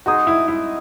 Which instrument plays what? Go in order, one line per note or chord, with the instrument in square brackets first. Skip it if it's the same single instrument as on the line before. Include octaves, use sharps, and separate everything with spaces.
[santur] G#3 D#4 G#4 D#5 [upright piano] F#4
[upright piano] E4
E4